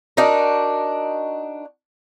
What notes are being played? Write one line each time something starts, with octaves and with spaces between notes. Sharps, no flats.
D4 D#4 F#4 A#4